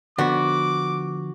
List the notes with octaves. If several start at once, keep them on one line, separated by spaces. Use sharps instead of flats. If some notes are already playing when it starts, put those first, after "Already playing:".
D3 F3 B3 F#4 D6